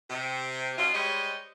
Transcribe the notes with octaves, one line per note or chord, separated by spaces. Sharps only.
C3
F#3 C#4 D#4 F4
G3 G#3 C5 C#5 D#5